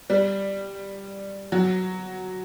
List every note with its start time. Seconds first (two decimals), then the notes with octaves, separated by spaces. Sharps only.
0.10 G3
1.52 F#3